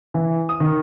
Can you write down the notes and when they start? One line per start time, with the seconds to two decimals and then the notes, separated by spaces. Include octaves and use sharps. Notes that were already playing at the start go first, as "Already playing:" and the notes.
0.14 E3
0.49 D#6
0.60 D#3